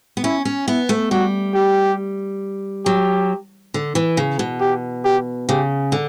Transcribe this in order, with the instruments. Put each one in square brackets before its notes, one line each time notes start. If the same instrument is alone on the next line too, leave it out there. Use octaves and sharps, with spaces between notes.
[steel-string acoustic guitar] B3
[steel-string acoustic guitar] C#4 [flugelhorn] E4
[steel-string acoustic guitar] C#4
[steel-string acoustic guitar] B3 [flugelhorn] E4
[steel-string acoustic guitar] A3
[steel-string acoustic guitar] G3 [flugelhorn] F#4
[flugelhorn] G4
[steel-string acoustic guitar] F#3 [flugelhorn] G4
[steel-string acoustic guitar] D3
E3
C#3
B2
[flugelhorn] G4
G4
[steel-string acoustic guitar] C#3 [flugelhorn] G4
[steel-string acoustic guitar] D3